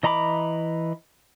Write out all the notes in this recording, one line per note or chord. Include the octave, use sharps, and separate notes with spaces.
E3 D#5 A#5 B5 D6